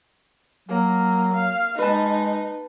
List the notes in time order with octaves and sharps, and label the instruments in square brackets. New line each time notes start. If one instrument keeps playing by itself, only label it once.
[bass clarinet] F#3 [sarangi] A#3
[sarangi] F5
[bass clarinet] G#3 [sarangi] D#4 [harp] B4 A5